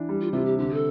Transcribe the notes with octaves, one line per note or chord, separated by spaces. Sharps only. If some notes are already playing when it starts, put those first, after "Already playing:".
Already playing: E3 D4
G3
F4
C3 F4
G4
D3 G4
A4